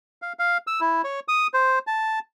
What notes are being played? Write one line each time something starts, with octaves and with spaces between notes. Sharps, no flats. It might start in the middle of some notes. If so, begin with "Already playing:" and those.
F5
F5
E6
E4
C#5
D#6
C5
A5